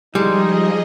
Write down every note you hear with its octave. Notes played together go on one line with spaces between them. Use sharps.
F3 G3 G#3 D#4 G#4 D#5